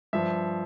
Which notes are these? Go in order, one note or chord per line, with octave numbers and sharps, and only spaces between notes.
G2 F3 E5